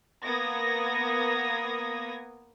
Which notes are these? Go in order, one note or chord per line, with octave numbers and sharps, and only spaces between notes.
A#3 B3 D#6 G#6 A#6